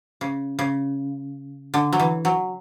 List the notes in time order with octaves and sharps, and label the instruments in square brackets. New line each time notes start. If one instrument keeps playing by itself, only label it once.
[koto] C#3
C#3
D3
F#3
E3
F#3